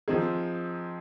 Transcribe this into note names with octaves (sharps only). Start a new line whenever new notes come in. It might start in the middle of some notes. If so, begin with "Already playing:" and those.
F3 C4 D#4 G#4